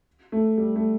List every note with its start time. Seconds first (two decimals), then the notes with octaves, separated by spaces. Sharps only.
0.32 A3
0.58 G3
0.76 A3